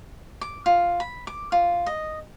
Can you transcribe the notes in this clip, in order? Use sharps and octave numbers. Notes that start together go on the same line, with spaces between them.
D6
F4
B5
D6
F4
D#5